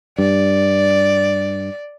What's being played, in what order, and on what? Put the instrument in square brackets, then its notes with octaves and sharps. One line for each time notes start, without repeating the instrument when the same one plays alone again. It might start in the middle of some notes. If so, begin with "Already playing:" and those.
[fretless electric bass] G2 [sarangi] D5